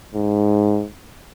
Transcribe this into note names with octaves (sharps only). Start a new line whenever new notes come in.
G#2